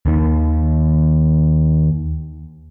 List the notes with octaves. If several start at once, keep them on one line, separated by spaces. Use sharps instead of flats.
D#2 D#3